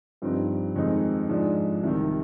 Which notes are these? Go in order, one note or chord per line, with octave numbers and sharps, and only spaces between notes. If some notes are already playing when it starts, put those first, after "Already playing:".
G2 F3 C4 D#4
F2 D#3 G#3 C4 D#4
G#2 F3 G#3 D4
C2 C3 D#3